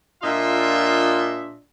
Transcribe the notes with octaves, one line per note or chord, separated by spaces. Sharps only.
A#2 D4 F4 D#5 E5 C6